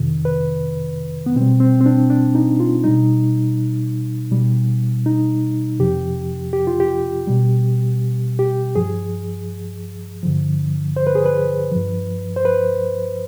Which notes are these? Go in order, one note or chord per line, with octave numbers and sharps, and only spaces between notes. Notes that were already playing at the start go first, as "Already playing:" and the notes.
Already playing: F2 C3 D#3
B4
B3
B2 G3 C4
C4
C4
D4
D4
D#4
F4
B2 G3 D#4
B2 G3
D#4
F2 C3 F3 G4
G4
F4
G4
B2 G3
G4
G2 F3 G#4
G2 D3 F3
C5
B4
G#4
B4
G2 F3
C5
B4